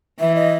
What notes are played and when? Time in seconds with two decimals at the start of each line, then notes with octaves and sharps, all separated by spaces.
0.19 E3 E5
0.36 D#5